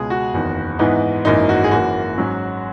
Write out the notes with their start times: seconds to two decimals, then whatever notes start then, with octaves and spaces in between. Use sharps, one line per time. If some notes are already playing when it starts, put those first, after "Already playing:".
Already playing: C#2 B2 G#3 G#4
0.10 F#4
0.33 F#1 E2 D#3
0.79 G#2 E3 B3 D#4
1.25 G#1 F#2 E3 A#3 D#4
1.49 F#4
1.64 G#4
1.71 F#1 F#2 E3 A#3 F#4
2.17 G#2 F#3 C#4